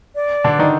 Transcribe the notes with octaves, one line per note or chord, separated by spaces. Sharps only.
D5
D3 D4
D#3 D#4